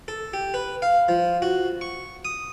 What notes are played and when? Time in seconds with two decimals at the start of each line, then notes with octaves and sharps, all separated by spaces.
0.08 A4
0.33 G4
0.54 B4
0.82 F5
1.08 F3
1.42 F#4
1.81 C#6
2.25 D#6